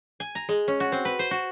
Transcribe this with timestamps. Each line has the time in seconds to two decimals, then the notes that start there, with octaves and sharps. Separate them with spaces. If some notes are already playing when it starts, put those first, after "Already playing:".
0.20 G#5
0.35 A#5
0.49 G#3
0.68 C#4
0.80 F#4
0.92 C4
1.05 B4
1.19 C5
1.31 F#4